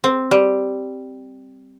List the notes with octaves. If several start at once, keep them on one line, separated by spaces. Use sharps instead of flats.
C4
G3